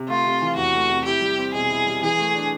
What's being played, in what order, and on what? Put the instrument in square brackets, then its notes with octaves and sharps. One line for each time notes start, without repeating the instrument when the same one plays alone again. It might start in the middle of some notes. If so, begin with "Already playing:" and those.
Already playing: [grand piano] C3
[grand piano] A3 [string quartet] F4
[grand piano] C3
E3
[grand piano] E2 [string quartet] F#4
[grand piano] A3
C3
[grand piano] E4 [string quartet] G4
[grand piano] G3
C4
[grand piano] B2 [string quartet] G#4
[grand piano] E4
G3
[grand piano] E3 [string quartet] G#4
[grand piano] A3
D4